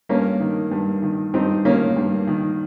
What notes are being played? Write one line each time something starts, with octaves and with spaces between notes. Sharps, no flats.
G2 A#3 C#4
D#3
G2
D#3
G2 C4 D#4
D#3 A#3 C#4
G2
D#3